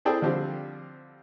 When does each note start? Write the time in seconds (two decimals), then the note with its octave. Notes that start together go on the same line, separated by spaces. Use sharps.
0.05 C4 E4 G#4 A4 D5 G5
0.22 D3 F3 G3 C4